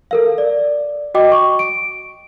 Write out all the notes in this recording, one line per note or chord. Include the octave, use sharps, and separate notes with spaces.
A4 A#4 F5
D5
F#4 D#5 G5 D6
C#6
D7